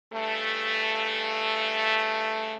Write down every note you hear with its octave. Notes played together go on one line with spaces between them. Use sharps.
G2 C#3 A3